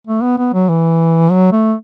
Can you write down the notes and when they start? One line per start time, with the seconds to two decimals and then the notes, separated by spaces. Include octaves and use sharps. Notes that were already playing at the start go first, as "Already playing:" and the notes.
0.07 A3
0.23 B3
0.38 B3
0.54 F#3
0.69 E3
1.31 F#3
1.52 A3